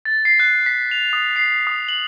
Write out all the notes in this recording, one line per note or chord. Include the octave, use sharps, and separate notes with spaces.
A6
C7
F#6
B6
F7
D#6
C7
D#6
F#7